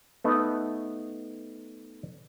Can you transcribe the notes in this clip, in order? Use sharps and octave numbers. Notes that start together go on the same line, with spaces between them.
A3 B3 D#4 D#5